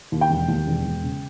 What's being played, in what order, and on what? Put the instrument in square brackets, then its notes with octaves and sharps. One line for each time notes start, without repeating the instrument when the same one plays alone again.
[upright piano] D#2
G5
E1
D#2
E1
E1
C#3